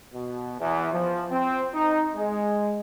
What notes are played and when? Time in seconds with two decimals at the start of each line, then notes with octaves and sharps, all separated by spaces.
0.13 B2
0.60 E2
0.92 F3
1.30 C4
1.75 D#4
2.16 G#3